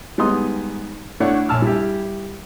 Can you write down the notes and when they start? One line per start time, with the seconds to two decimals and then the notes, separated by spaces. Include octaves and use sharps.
0.18 G3 G#3 B3 D#4 C6 D#6
1.20 A3 D4 E4 C#5 D5 F#5
1.49 A#1 G#5 A5 E6 F6
1.62 G3 E4 G4